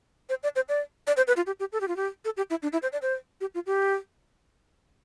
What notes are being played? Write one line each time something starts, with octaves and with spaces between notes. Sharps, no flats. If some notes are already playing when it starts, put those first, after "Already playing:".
C5
D5
C5
D5
D5
C5
B4
F4
G4
G4
A4
G4
F4
G4
A4
G4
E4
D4
E4
C5
D5
C5
G4
F4
G4